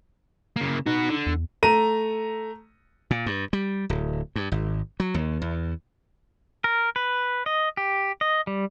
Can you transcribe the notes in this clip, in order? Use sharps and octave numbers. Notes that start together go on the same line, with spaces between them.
C#3 A#3
D#4 F#4 B4
D3
E2
A3 A#5 D#7
A#2
G2
G3
D1
G2
G#1
F#3
D#2
E2
A#4
B4
D#5
G4
D#5
G3